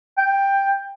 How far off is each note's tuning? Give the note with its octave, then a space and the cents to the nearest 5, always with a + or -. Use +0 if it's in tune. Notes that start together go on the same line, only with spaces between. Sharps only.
G5 +10